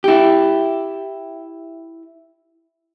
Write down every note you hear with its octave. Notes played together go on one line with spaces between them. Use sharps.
E4 G4